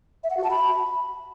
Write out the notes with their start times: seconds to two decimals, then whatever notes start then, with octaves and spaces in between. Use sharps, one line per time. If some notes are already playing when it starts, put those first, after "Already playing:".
0.24 E5
0.30 F#5
0.37 F#4
0.44 A5
0.50 B5